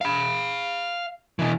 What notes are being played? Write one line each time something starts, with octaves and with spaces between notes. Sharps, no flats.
F5 B5
B2 E3